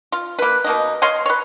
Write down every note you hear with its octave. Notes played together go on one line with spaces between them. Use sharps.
F4
A#3 B4
B2 A#3 D#4
C#5 D#5 F5 C6
B4 C#5